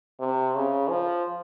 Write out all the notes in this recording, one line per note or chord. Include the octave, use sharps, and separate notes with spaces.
C3
C#3
F3